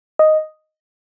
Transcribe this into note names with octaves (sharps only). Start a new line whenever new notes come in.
D#5